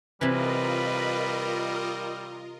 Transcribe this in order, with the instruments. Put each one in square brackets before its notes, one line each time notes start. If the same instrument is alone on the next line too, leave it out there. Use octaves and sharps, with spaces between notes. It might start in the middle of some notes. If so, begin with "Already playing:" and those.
[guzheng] C3 E3 [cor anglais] G3 [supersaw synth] F4 A#4 D#5 [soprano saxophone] B4